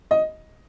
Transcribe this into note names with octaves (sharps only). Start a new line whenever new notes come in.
D#5